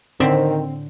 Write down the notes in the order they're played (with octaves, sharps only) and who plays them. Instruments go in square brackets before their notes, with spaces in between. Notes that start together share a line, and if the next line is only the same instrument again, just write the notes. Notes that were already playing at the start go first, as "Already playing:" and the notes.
[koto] A2 D3 E5 [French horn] D#3 [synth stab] C4